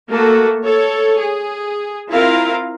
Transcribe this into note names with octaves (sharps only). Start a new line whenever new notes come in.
A3 A#3 F#4 A4
A4 C#5
G#4
C4 E4 F4 A#4 F5